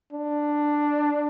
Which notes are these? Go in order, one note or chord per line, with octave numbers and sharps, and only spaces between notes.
D4